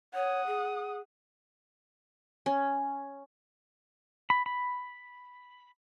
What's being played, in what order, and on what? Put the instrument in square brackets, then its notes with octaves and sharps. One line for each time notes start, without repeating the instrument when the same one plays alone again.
[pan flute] C#5 [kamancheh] F#5 D#6
[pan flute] G#4
[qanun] C#4
[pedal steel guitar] B5
B5